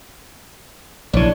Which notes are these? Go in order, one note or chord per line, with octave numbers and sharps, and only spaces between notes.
A#1 E3 D4 C#5 D5